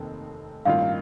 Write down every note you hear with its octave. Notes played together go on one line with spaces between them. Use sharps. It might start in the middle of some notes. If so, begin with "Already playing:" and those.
Already playing: F1 D#2 D#3 A3 C4
A1 G2 D#3 A#3 F4 F5